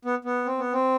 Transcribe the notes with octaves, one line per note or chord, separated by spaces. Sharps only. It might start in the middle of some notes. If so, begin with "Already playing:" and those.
B3
B3
C4
B3
C4